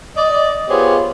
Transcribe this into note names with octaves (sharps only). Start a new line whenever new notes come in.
D5 D#5
B3 F4 G4 G#4 C5 C#5